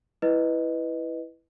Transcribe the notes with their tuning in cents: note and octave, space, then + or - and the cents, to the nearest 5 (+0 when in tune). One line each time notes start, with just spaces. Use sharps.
E4 +0 B4 +0 D#5 +0